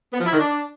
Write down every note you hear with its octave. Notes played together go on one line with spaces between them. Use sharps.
B3
F3
E4
D#3
D4